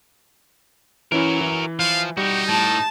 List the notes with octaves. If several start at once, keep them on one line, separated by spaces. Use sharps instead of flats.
E3 C#4 E4 F#4 A#4
E3
F3 F5
G3 D#4 F#4 G4
A2 A5